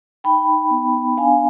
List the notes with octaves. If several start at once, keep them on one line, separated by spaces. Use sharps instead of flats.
D#4 G5 B5
D#4
B3
B3
D4 F5 G#5